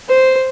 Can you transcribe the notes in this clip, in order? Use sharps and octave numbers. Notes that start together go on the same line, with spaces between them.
C5